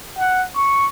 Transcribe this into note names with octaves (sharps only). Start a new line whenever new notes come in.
F#5
C#6